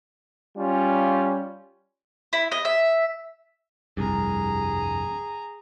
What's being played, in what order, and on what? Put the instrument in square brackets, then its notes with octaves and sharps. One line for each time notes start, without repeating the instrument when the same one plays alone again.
[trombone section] G3 C#4 F4
[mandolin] E4
D#5
E5
[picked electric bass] F1 C2 G2 [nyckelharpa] G#4 A#5